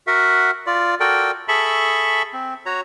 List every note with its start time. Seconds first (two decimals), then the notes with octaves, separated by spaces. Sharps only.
0.07 F#4 A#4 E5 F#5
0.67 F4 D5
1.00 F#4 A4 A#4 D5 G5
1.48 G#4 A4 E5 A5 B5 C#6
2.33 C4
2.66 F#4 C#5 A#5